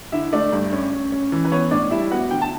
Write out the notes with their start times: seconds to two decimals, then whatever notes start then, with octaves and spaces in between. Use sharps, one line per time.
0.12 D3 E4 E5
0.33 A3 D4 D5
0.53 G2
0.73 C#4
0.93 C#4
1.12 C#4
1.32 E3
1.45 B4
1.51 B3 C#5
1.71 A2 D4 D5
1.91 G3 E4 E5
2.11 B3 F#4 F#5
2.31 D3 G5
2.42 A5